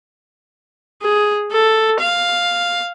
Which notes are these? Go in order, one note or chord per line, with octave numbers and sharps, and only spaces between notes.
G#4
A4
F5